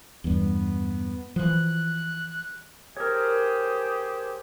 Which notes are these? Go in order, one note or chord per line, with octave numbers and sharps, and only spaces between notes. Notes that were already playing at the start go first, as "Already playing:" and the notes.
E2 G2 B3
E3 F3 F#6
G4 G#4 A#4 C5 C#5